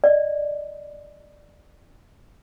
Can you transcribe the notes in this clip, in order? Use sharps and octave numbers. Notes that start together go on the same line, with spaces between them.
D5 D#5